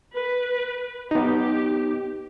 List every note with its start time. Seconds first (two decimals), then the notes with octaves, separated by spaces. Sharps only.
0.12 B4
1.11 B3 D#4 G4